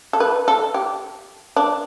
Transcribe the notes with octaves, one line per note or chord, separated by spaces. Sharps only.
A4
B4
A4
G4
D4